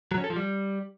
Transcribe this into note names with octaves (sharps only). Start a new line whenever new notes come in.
F#3
C#4
A4
F3
G3